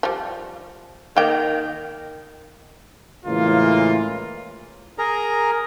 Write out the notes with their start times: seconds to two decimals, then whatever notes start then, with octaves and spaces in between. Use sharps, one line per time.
0.03 F3 G3
1.17 D#3 A#3 G5
3.25 A2 C#3 E3 G#3 A#3 F4
4.98 G#4 A#4 A#5